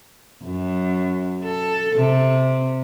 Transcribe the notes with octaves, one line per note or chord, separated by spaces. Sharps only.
F#2
A4
C3